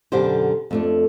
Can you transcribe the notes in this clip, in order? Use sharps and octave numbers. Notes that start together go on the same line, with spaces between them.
F#2 B2 D3 G4 C5
F2 A3 D4